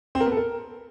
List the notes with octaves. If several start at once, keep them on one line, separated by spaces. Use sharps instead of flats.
C4
A#4
B3
A4
A#4